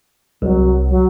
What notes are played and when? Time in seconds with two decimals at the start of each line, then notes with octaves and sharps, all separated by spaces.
0.42 C2 F#3
0.90 F#3